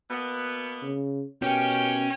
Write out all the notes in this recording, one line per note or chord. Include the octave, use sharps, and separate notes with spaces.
B2 A#3 B3
C#3
B2 C#4 G4 A#4 G5